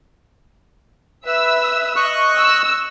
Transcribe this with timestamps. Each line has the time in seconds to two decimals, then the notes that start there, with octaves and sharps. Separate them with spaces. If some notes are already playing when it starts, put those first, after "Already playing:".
1.26 B4 E5 E6
1.96 D#5 C#6 F#6
2.37 E6